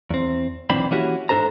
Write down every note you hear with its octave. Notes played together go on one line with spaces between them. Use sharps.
E2 C4
B1 E3 C4 D4 B5
E3 A#3 C#4 E4 F#4 G4
G#2 D4 A4 C5 A#5